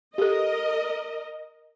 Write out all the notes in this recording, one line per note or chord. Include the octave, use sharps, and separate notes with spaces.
G4 A4 A#4 D#5